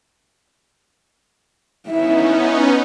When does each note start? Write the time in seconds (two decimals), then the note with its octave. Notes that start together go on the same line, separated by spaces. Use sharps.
1.89 B3 C#4 D#4 E4 E5